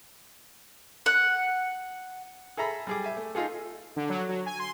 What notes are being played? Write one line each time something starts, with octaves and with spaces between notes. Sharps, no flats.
F#5
G#4 A4 E5 A#5 B5
G3 G#4 D6
E5 G#5
A3
D#4 F4 G#4 A4
D3
F#3
F#3
G#5
C6